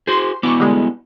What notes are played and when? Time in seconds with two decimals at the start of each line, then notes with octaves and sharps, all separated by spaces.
0.07 F#4 G#4 C5 C6
0.43 B3 E4 F#4 C#6 D6
0.60 D3 G3 G#3